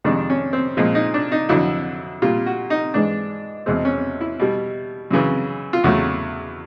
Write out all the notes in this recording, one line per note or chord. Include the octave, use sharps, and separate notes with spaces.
F2 C3 D#3 G#3 D4
C#4
C4
A#2 F3 G#3
D#4
D4
D#4
F2 D3 F#3 E4
A#2 G3 F4
F#4
D#4
G#2 E3 G#3 D4
E2 B2 G#3 C4
C#4
E4
B2 G3
F#2 C#3 E3
F4
E2 C#3 F#3 A3 F#4